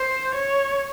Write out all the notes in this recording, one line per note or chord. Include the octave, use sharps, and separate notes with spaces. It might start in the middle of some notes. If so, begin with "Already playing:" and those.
Already playing: C5
C#5